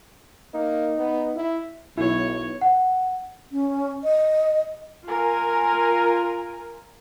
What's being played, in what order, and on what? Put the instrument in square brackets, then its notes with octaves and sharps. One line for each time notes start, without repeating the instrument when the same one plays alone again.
[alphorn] A#3 [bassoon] D#4
[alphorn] B3
E4
[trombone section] B1 [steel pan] E4 F#4 [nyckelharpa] C#5
[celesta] F#5
[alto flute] C#4
D#5
[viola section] F4 A#4 G#5